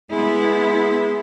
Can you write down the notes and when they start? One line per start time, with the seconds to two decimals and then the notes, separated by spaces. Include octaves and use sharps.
0.11 G#3 B3 E4